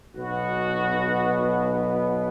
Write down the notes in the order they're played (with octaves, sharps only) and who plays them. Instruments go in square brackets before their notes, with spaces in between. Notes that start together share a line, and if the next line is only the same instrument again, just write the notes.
[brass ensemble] B1 B2 B3 F#4